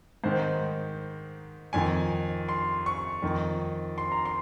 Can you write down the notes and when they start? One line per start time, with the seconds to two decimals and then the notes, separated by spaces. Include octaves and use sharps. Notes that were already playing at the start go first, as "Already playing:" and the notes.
0.24 G#2 D#3 C5
1.73 F2 D#3 G#5
2.49 C6
2.86 C#6
3.22 F2 D#3
3.98 C6
4.12 A#5
4.25 C6